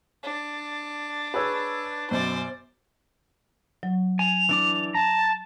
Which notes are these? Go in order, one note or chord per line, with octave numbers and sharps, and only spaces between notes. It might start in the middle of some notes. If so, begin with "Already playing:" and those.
D4
G#4 B4 C#5 E6 G#6
F#2 B2 C5 D5
F#3
G#5 F7
E3 D4 D6
A5 A#5